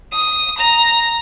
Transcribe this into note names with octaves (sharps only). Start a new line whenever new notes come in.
D#6
A#5